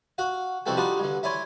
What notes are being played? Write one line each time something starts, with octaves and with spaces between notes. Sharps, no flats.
F#4 F5 F#5
C2 F2 C4 F#4 A4 G5
G3 D4 D#4 F4 F#4
G2 D3
E4 C#5 D5 G#5 C6